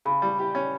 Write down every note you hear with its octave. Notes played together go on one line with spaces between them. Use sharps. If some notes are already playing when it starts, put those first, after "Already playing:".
C#3 B5
G3
G4
C#4